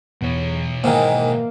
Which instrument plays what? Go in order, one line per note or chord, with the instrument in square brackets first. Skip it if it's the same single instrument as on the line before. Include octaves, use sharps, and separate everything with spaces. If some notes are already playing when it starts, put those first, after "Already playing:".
[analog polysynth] E2 [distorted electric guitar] B2 C#5
[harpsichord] G#2 D#3 E3 [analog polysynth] A#3